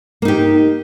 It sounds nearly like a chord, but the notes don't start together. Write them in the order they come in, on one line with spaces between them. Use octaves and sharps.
A#3 D#4 G4